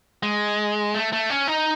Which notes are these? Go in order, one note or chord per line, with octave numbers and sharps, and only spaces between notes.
G#3
A3
A3
C#4
D#4